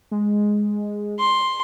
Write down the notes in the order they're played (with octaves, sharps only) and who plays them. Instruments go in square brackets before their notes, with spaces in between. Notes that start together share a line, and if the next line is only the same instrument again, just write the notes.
[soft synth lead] G#3
[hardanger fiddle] C6